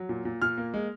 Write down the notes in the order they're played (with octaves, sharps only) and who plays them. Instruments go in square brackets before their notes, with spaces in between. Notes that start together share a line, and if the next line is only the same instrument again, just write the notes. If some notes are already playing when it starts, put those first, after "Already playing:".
Already playing: [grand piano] F#3
A#2
A#2
A#2 F6
A#3
G#3